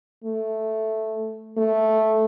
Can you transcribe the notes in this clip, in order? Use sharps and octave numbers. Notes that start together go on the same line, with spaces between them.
A3
A3